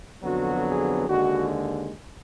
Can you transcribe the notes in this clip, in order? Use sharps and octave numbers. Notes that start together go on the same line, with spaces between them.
F2 D3 F#3 B3 F#4
G#4
D#2 D3 G#3 F#4